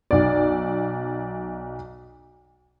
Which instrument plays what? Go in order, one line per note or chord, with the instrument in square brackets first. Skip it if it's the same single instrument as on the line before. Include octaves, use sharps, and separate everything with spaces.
[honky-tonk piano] B1 D5